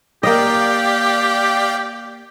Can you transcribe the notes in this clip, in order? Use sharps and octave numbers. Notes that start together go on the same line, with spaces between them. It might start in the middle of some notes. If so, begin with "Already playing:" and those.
A#3 G4 D5 D#5 F5 G5